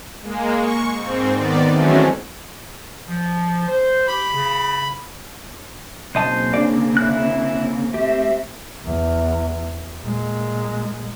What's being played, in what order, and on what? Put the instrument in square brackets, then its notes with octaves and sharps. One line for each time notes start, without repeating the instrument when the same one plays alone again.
[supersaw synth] G#3 A#3
C#6
G#2 C4
D#3 B3 D5
E3 F#3 G#3 A3 C4 C#4
[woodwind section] F3
C5
[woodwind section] G4 [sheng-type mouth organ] B5
[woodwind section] C#3
[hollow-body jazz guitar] B1 D#5 A5 [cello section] C#3 A#3 C4 [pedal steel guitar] C5
[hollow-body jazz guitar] D4 D5
[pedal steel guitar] E4 F#6
[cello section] A3 C4 E5 [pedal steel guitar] G4
[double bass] E2
A#2 G#3